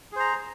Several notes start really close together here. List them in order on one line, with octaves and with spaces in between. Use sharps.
G#4 C5 A#5